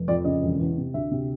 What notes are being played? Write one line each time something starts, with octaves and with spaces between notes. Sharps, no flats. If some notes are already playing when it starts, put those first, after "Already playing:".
Already playing: F1
F2 D5
C#3 D#5
E1
E2
C3
D2 E5
C3